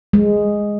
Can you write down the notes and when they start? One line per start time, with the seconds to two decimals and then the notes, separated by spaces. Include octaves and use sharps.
0.13 G#3